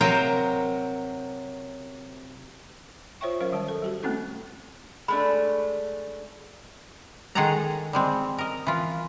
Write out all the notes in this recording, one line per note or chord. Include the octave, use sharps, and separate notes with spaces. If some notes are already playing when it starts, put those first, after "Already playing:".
C3 F#3 A#4 C5 F5 G5
F4 C5 C#5 E5 G5 C#6
F#3 C#4 A#4 C5 F5
D#3 G3 A5
A4
G3 F#4 G4
A3 A#3 C4 C#4 E4 A4
G#3 A3 D4 B5
D#3 G#3 G#4 A4 F#5 A#5
G3 G#3 C4
A#4 D#5
E3 F4